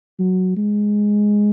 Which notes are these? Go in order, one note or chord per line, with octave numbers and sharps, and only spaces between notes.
F#3
G#3